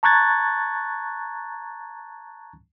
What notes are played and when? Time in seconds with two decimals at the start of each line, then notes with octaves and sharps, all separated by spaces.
0.03 A5 A#5 C#6 F#6 G#6 A6